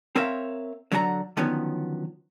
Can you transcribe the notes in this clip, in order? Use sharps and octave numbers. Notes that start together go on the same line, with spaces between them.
C4 A#4 C#5 E5 F5
D3 F#3 D4 F#5 G#5 A#5
D3 D#3 F3 F#3 B3 C#4